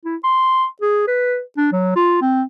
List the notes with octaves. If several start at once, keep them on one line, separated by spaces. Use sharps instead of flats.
E4
C6
G#4
B4
D4
F#3
F4
C4